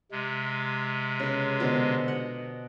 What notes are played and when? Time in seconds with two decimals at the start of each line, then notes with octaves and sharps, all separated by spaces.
0.11 C3 G#3
1.20 C#3 B4
1.60 B2 D3 F3
2.08 D#5 F#5